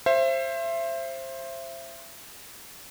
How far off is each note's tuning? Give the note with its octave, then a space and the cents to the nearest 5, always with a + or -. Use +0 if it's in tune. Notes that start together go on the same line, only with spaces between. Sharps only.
C5 +20 E5 +30